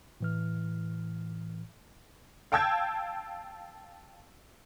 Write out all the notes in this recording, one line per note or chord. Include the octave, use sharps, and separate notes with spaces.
A2 E3 F6
F5 G5 A5 E6 G6 G#6